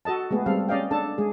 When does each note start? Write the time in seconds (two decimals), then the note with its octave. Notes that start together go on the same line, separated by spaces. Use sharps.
0.05 F#4 A4 D#5 A5
0.31 G#3 A3 B3 G#4
0.46 G3 C4 A4 F5
0.69 C#4 D5 D#5 F5 G5
0.91 D4 A4 A5
1.18 G#3 G#4